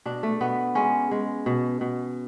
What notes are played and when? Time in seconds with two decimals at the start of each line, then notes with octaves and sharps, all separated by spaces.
0.05 B2 D4
0.23 A3
0.41 B2 B3
0.75 G#3 C#4
1.11 G#3
1.46 B2
1.81 B2